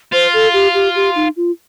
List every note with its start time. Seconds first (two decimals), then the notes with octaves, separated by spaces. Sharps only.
0.12 F4 C5
0.33 A4
0.54 G4
0.74 G4
0.95 G4
1.15 D#4
1.36 F4